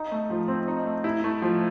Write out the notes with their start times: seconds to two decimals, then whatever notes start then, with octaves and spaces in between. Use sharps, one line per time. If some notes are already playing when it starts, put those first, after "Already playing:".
Already playing: D#4
0.11 A3
0.30 F3
0.48 C4
0.68 D#4
0.86 A3
1.04 E4
1.24 A3
1.42 F3